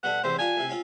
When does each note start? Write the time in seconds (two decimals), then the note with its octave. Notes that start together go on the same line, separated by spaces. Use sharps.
0.03 B2 G3 A3 F#5
0.24 E2 A2 C3 C5
0.38 D4 F4 G4 G#5
0.57 A2 C3
0.70 C4 C#4 F4